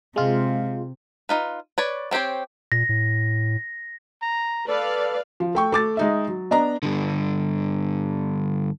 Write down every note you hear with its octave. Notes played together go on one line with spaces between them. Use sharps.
C3 G#3 F4
D#4 F4 B4
B4 C#5 D5
B3 C4 G4 C5 C#5
A#2 A#6
A2
A#5
A4 B4 D5 F5
F3
A3 G5 C#6
A3 D6 A6
G#3 D#4 E5
F#3
B3 D4 D#5 A#5
G2 D3